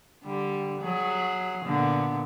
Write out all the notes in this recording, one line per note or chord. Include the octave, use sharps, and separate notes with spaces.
D3 G3
F#3 G#4
A#2 D3 B3